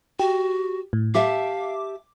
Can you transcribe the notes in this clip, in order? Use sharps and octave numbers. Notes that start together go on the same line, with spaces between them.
F#4 G4
A2
G4 E5 F5 A5 D6